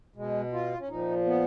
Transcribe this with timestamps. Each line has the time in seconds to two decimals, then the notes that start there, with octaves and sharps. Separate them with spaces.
0.16 B2 G#3
0.53 F4
0.80 C#4
0.88 A#2 F3 D#4
1.25 B3